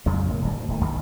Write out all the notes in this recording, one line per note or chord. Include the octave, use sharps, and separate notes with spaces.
F2 C#3 F#3 G#3
A2 C#3 A3 A#3
D1 G1 G2 G3
D2
D#1 D#3 A3
A#1 D#3